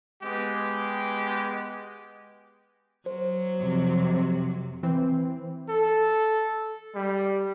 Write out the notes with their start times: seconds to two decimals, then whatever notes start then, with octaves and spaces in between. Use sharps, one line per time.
0.23 G#3 B3 G4
3.06 F#3 C5
3.57 F2 C3
4.83 E3 C4
5.69 A4
6.95 G3